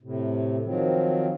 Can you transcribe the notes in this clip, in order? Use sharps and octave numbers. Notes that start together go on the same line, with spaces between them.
A2 C3
D#3 F3 F#3 C4